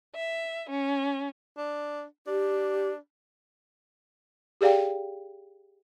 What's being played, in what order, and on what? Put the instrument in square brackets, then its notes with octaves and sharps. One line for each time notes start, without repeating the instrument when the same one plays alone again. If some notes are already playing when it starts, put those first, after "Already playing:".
[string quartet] E5
C#4
[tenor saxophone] D4
[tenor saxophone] D4 [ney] G4
[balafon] G4 G#4 D5 F5 G5